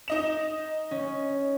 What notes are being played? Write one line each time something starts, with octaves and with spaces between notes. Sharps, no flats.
D#4 D#5 E7
C#4